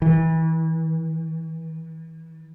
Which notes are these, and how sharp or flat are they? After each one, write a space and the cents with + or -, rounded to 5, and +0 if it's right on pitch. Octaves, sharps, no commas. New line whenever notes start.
E3 -30